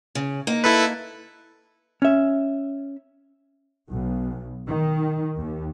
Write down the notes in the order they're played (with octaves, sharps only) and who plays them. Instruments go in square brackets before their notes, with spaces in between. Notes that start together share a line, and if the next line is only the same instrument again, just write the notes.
[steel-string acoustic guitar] C#3
A#3 D#4
[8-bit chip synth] E4 A4 B4
[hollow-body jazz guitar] C#4 E5
[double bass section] B1
D#3
D#2